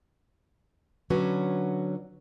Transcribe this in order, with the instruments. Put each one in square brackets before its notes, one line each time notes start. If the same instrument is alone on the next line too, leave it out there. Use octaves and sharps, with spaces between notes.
[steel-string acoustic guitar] D3 F#3 C#4 F#4 B4